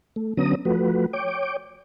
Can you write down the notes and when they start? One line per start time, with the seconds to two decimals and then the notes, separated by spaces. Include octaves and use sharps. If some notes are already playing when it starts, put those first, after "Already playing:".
0.16 A3
0.37 D3 F#3 B3 C#4 A#5 D#6
0.65 F3 A3 F#4 B4
1.13 C#5 G5 D6